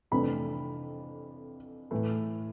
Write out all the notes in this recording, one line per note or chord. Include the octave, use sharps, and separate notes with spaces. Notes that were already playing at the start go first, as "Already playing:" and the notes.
F2 C3 E3 A3 D4 B5
A2 E3 A3